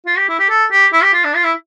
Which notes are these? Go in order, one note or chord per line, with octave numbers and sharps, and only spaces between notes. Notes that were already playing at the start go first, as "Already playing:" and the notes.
F4
G4
E4
G4
A4
G4
E4
G4
F4
D4
F4
E4